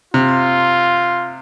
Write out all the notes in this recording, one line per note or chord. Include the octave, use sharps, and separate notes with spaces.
C3 F4